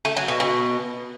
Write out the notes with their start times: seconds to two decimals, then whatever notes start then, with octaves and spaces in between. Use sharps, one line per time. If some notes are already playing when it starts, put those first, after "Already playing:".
0.05 A3
0.17 F#3
0.28 B2
0.40 B2